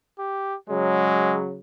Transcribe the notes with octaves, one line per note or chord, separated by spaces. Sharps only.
G4
C#3 F#3 G#3